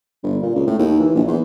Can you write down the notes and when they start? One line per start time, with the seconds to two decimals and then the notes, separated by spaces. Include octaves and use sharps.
0.23 G1
0.42 A#2
0.55 C#2
0.67 A2
0.79 D#2
1.00 E3
1.15 A#1
1.27 E2